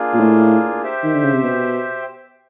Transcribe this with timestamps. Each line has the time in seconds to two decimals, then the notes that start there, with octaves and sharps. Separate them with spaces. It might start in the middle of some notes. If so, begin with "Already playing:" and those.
Already playing: A#3 D4 F4 G#4
0.14 A#2
0.20 A2
0.82 G4 C5 E5 G5
1.04 D#3
1.14 D3
1.24 C#3
1.34 C3
1.44 B2